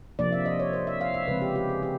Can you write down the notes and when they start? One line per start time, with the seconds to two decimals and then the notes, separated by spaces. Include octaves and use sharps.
0.19 C3 F3 A#3 D4 D5
0.32 E5
0.46 D#5
0.60 C#5
0.73 C5
0.87 E5
1.01 F5
1.14 E5
1.28 C#3 F3 G#3 C4 B4
1.42 G4
1.56 G4
1.69 G#4
1.83 G4